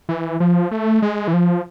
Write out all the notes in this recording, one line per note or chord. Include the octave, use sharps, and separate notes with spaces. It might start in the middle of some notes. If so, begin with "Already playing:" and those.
E3
F3
A3
G#3
E3
F3